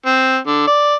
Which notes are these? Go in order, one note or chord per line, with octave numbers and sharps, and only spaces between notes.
C4
D3
D5